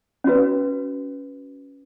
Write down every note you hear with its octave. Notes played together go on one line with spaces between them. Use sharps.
C#4 F#4 B4